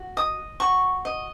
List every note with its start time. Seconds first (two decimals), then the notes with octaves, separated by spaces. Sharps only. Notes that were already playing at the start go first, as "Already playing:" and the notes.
Already playing: F#4
0.17 D#5 D#6
0.60 F#4 C#6
1.05 D#5